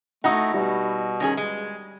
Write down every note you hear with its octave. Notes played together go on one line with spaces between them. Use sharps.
A3 D#4 E4 F#4 F#5 A#5 D#6
B2 G3
D#3 C#4 G#4
G#3